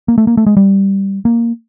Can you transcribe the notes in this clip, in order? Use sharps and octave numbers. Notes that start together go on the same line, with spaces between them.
A#3
A3
A#3
A3
G#3
G3
A#3